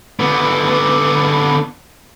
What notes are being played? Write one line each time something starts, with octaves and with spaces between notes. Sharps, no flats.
D3 B3